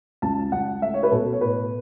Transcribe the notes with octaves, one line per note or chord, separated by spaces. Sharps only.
C#2 A5
C#2 F#5
A3 E5
C#5
B4
B2 A4
C#5
A2 B4